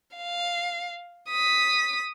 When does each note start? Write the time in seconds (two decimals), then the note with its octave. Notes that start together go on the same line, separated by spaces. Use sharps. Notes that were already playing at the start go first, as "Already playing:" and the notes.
0.16 F5
1.29 D#6 B6